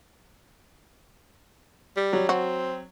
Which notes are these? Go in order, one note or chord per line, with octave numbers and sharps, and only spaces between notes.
G3
F#3
C4 F#4